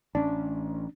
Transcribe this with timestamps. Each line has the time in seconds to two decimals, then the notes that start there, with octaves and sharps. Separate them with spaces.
0.15 A1 C#4 D4